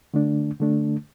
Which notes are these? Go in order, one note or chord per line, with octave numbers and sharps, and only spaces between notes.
D3 A3 D4
D3 A3 D4